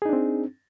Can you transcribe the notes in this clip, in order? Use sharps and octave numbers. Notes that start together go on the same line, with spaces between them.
C4 D4 D#4 G#4